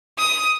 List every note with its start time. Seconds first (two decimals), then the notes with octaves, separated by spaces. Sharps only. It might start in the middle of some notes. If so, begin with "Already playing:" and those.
0.18 D#6